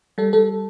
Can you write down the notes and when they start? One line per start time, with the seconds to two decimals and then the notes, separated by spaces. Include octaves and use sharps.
0.18 G3 A4
0.33 G3 A4